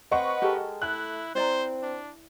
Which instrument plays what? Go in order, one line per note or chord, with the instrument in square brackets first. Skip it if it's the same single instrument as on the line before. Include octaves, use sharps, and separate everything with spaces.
[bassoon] C4 [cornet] B4 [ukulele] C5 [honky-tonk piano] D#5 F#5 C#6
[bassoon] G#3 [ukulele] G4 A4 A#4
[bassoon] A3 [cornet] E4 [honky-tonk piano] F#6
[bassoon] C4 [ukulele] E4 D5 A#5 [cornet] C5
[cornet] D4